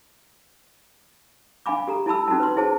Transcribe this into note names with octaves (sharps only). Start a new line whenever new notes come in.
D4 F5 G#5 B5 D6
G4 A4 A#5
E4 A4 A5 B5 E6
C#4 D#4 F#4 A4 A5
B4 C6
E4 G#4 C5 A5